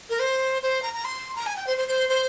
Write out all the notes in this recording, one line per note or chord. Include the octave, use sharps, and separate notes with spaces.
A#4
C5
C5
A#5
A#5
C6
A#5
G#5
G5
C5
C5
C5
C5